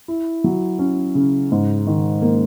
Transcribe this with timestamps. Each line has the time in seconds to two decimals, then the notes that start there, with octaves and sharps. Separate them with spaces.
0.08 E4
0.44 F#3
0.79 C#4
1.15 C#3
1.52 G#2
1.87 D#3
2.22 A#3